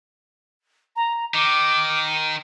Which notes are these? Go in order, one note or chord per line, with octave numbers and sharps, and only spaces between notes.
A#5
D#3 D6